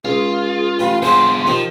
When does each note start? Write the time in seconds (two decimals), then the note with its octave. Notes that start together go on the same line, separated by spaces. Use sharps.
0.05 C#2 F4 G#4
0.79 A1 G4 B4 F5
1.02 B3 D4 F4 G#4 C5 C6
1.47 D#3 F3 D#4 G4